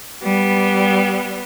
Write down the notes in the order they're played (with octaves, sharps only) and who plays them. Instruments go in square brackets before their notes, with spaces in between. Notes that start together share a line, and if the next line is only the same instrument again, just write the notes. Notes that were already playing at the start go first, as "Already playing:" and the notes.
[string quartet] G3 B3